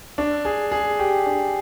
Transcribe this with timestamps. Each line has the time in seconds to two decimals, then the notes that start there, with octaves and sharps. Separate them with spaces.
0.18 D4
0.45 G#4
0.72 G#4
0.99 G4
1.26 D4